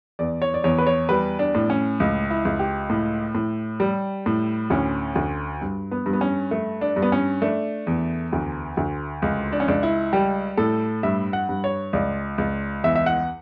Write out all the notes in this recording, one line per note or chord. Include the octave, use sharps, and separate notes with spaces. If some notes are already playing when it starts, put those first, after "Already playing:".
E2 D5
C#5
D5
E2 C#5
B4
C#5
G3 B4
D4
A2
C#4
C#2
E4
C#2
G4
A2
A2
G3
A2
D2 C#4
D2
G2
B3
G2
B3
C#4
A3
D4
G2
B3
C#4
A3 D4
E2
D2
D2
C#2
D4
C#4
C#2 D4
E4
G3 G4
A2 A4
G2 E5
F#5
G2
C#5
C#2 D5
C#2
E2 E5
E5
F#5